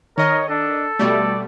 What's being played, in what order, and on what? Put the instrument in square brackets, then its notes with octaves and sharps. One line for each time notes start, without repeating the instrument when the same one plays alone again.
[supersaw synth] D#3 D#5 [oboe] A#4 [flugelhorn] C#5
[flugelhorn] D4 [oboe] A4
[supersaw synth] B2 G3 A3 [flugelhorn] D5